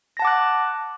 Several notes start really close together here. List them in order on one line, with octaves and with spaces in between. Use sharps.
A#6 A5 F#5 D6 F#6